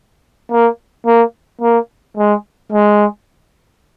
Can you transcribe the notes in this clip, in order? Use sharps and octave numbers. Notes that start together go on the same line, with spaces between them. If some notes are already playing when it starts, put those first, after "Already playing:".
A#3
A#3
A#3
G#3
G#3